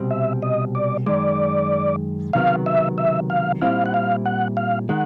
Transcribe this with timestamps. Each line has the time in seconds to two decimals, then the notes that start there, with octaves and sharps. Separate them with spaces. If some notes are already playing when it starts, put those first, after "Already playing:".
Already playing: C2 B2 G3 C4
0.11 E5
0.42 D#5
0.75 D5
1.06 F#2 D#3 G#3 D5
2.33 C#2 C3 D#3 F#3 B3 F5
2.66 E5
2.98 E5
3.30 F5
3.62 A#2 G3 C4 E4 F5
3.86 F#5
3.94 F5
4.26 F#5
4.57 F5
4.89 D#3 G#3 F#5